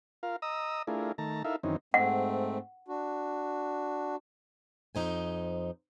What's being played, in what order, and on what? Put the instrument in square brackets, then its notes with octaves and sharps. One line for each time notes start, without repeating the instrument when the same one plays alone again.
[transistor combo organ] F4 A#4 F5
D#5 A#5 D#6 E6
A3 D4 E4 F4 G#4 A#4
D#3 A3 A5 A#5
D#4 E4 A4 A#4 E5 F5
F#2 D#3 E3 C4 C#4 D#4
[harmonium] G#2 A3 C4 [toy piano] F#5
[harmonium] D4 F#4
[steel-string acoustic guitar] F2 D#4 C5 G#5